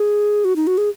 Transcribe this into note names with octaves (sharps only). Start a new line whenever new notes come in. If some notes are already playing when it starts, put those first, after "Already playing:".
Already playing: G#4
F#4
D#4
F#4
G#4